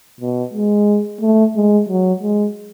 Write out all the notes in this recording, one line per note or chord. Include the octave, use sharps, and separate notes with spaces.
B2
G#3
A3
G#3
F#3
G#3